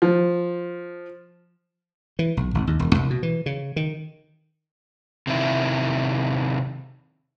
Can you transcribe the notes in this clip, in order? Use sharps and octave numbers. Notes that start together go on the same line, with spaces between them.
F3
E3
B1
G#1
D#2
E1
C2
B2
E3
C#3
D#3
C3 D#3 E4